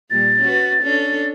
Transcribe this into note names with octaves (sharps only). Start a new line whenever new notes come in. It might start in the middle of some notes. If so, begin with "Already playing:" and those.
A#2 G3 A6
C#4 F#4 B4
C#4 D4 A4